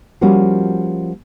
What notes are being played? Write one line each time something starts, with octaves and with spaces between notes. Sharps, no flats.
F3 G3 A#3 C#4 F#4